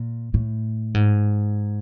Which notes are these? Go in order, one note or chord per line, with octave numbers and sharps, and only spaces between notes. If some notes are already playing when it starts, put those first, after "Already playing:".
Already playing: A#2
A2
G#2